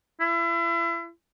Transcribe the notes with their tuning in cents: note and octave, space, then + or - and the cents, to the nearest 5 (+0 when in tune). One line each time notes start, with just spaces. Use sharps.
E4 +35